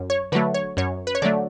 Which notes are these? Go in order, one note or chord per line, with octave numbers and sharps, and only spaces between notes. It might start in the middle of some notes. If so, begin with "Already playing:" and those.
Already playing: F#2
C#5
D3 F#3 A3 B4
C#5
F#2 C#5
B4
C#5
D3 F#3 A3 D5